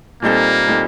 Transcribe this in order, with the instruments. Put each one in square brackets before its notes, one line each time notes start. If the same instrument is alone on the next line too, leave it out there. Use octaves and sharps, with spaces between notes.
[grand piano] A#2 G3 C4 D#4 A4 [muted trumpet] A#3
[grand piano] A#2 G3 C4 D#4 A4